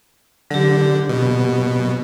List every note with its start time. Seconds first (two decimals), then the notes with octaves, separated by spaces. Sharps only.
0.50 D3 F#3 G4
1.09 B2